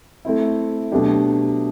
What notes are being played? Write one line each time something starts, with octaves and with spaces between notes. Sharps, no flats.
A3 C4 E4
B2 F#3 A3 D4 G4